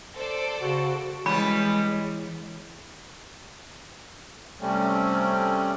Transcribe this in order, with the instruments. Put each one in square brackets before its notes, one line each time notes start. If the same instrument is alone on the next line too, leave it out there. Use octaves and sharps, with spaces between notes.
[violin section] A4 C5 D5
[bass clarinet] C#3 [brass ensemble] F#4
[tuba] E3 [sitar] G3 B3 C#4 [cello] G#3 [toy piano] B5
[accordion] C3 G3 A3 C4 C#4